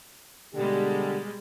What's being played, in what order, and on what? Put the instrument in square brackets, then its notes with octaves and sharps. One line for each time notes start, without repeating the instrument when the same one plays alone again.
[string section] B2 G3 G#3 [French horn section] D3 G4